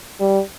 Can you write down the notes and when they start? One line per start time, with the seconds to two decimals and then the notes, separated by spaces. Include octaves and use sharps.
0.20 G3